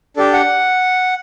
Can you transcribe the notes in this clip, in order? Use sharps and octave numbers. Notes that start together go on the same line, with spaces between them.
D4 G4 A4
F#5